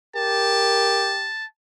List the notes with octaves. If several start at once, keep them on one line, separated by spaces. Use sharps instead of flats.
G4 A#4 A5